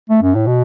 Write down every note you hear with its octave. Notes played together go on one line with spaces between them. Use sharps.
A3
F#2
A2
B2